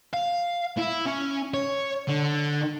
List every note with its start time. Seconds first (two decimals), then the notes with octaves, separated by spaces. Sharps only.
0.13 F5
0.78 E4
1.05 C#4
1.54 C#5
2.08 D3